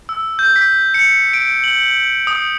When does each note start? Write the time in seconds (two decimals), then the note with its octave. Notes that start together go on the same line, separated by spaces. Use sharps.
0.09 E6
0.39 G6
0.56 B6
0.94 C#7
1.33 D7
1.64 F#7
2.27 D#6